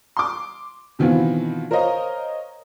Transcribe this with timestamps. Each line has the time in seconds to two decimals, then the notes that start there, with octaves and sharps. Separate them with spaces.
0.17 C6 D6
0.99 B2 D#3 E3 B3 C4 F4
1.71 A#4 C5 C#5 D#5 F5 A#5